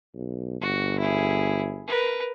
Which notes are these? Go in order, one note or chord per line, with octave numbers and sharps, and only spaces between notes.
B1
G1 F#4
E4 G#4
A#4 B4